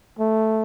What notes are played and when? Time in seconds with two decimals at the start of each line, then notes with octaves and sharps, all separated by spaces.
0.19 A3